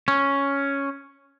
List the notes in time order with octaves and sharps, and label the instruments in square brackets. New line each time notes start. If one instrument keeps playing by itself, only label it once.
[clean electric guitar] C#4